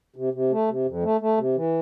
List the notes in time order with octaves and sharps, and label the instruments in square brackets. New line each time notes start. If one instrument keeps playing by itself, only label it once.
[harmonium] C3
C3
A3
C3
F2
A3
A3
C3
E3